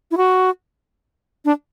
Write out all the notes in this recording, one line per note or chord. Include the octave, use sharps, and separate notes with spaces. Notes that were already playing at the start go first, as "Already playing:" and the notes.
E4
F#4
D4